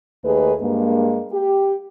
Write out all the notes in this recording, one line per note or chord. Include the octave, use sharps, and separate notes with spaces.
D#2 A3 D#4 G#4 B4
G2 G#3 A#3
G4